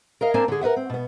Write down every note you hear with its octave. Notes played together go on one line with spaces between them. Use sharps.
A#4 D#5 F5
A#3 C4 D4 A#4 G#5 A5
D3 G#4
A#4 B4 E5 F#5
C4
B2 B3